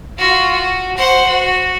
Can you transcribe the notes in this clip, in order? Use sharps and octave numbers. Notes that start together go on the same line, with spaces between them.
F4 F#4
F#4
C5 F#5
F#4